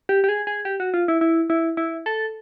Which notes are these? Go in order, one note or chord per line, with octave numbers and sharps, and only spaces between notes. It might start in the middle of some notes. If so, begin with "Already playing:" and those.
G4
G4
G#4
G#4
G4
F#4
F4
E4
E4
E4
E4
A4